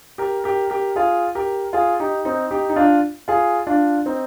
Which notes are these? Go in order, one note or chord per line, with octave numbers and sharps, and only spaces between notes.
G4 A#4
G4 A#4
G4 A#4
F4 G#4
G4 A#4
F4 G#4
D#4 G4
C4 D#4
D#4 G4
D#4
D4 F4
F4 G#4
D4 F4
C4 D#4